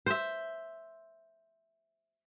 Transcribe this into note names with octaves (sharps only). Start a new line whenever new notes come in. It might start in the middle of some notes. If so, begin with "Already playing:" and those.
C5 E5